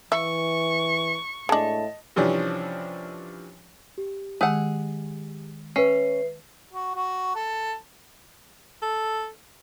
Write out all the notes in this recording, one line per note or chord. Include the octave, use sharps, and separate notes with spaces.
E3 E5 C#6
A2 G#3 D4 D#5 A5
C3 E3 F3 G3 C#4 D4
G4
D#3 G#3 G#4 F#5 E6
C#4 B4 E5 C7
F#4
F#4
A4
A4